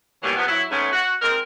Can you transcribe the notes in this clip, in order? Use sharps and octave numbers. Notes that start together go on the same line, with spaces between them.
B2 D#3 E3 F#3 G3 A#3
E2 C3 F3 B3
F#3 E4
G#2 G#3 A3 B3 C#4
F#4
G#3 C4 D#4 A#4